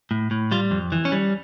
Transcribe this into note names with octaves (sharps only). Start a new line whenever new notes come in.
A2
A2
G3 F4
F2
E3
C#4
G3